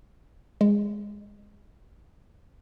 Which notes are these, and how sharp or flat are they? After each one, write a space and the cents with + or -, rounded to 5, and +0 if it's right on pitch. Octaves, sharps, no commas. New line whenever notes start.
G#3 -15